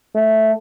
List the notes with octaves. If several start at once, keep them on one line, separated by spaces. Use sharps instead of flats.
A3